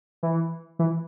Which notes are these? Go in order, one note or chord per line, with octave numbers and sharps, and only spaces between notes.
E3
E3